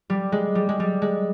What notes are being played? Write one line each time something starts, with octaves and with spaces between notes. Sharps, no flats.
G3
G#3
G3
G#3
G3
G#3